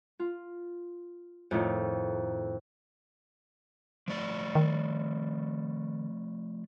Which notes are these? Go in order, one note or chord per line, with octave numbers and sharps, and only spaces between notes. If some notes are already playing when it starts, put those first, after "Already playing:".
F4
F2 A2 D#3
F3 A3 D5
D#3